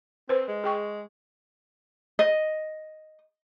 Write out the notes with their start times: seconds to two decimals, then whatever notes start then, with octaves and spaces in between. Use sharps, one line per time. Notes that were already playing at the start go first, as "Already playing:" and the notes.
0.29 C4 B4 C5
0.48 G#3
0.64 G#4 G5 C#6
2.19 D#5